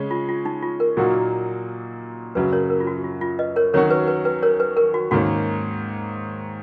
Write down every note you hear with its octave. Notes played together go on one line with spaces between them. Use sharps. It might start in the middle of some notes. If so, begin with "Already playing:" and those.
Already playing: C#3 G#3 C#4
F4
F4
D#4
F4
A#4
A#2 F#3 A#3 D#4 F#4
F#2 C#3 F#3 B4
A#4 C#5
A#4
F4
F#4
F4
F4
B4 D#5
A#4 C#5
D#3 F#3 C#4 F#4 A#4 C#5
B4
B4
B4
A#4 C#5
B4
A#4
F#4
G#2 D#3 A#3 C#4 F#4